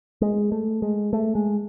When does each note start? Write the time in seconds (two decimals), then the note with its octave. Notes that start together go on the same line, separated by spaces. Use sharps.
0.21 G#3
0.52 A3
0.82 G#3
1.13 A3
1.35 G#3